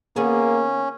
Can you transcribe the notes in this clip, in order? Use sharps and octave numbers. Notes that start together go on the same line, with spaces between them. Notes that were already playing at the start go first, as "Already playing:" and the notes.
D#3 A#3 B3 C#4 G#4